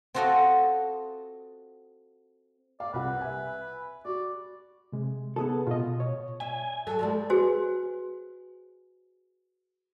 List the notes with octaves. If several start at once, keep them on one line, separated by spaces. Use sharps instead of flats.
C4 F4 F#4 A4 D#5
D5 F5
C2 F4 B4 F#5
E5 G#5
F#4 D5
C3 G#3
B3 G#4 A4
B2 F4 D#5
C#5
E5 G#5
F#3 A4
F3 G3 G#3
F#4 G#4 B4 C5 G#5